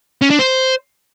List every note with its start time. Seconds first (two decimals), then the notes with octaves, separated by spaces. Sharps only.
0.22 C#4
0.30 D4
0.39 C5